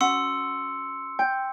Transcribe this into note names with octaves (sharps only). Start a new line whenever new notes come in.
C#4 F#4 F#5 C6 E6 C#7
G5